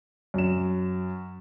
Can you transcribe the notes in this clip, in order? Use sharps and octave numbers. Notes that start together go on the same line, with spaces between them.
F#2 E7